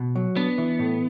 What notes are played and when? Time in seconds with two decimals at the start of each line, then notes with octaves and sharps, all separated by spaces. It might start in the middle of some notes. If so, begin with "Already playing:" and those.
Already playing: B2
0.16 F#3
0.36 B3 D4
0.58 E3
0.79 A2